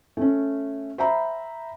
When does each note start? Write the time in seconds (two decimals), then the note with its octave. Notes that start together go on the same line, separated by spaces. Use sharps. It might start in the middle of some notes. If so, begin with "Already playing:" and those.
0.17 A3 C#4
0.98 C5 E5 G5 A#5 B5